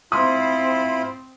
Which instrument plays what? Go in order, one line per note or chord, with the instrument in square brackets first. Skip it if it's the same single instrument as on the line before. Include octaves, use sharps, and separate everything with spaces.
[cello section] C4 C5 [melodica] E4 F4 B5 [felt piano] C6 D#6